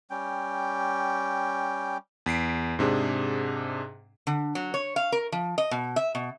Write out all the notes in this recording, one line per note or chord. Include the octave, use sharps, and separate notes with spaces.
G3 C#4 G5
E2 B6 C7 D7
G#2 C3 D4 G#4
D3
F#3
C#5
F5
A#4
F3
D#5
B2
E5
B2